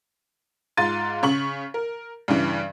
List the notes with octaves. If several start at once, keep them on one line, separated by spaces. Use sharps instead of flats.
G#2 F4 C6 A6 D#7
C#3 C#6 F#7
A#4
G2 C#3 E3